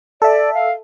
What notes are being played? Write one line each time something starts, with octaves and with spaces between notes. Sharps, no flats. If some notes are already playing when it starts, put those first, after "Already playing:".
A4 D5 E5
F5